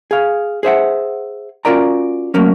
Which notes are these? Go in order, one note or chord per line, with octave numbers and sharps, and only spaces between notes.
G#4 F5
G#4 C5 E5 F#5
C#4 F4 F#4 A#4 D5 A#5
F#3 A3 A#3 C#4